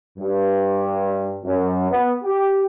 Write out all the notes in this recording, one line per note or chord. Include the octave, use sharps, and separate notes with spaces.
G2
F#2
B3
G4